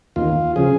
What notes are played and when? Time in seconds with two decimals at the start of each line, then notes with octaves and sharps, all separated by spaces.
0.16 D#2 F4
0.56 C#3 F3 G#4